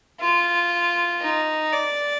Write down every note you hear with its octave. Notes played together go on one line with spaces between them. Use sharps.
F4
D#4
D5